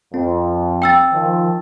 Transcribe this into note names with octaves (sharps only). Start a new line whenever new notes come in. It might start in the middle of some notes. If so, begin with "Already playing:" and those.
F2 C4
G5 E6 A6
D#3 F3